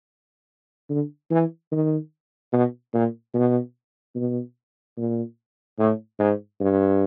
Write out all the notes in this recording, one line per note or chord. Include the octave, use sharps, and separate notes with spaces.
D3
E3
D#3
B2
A#2
B2
B2
A#2
A2
G#2
G2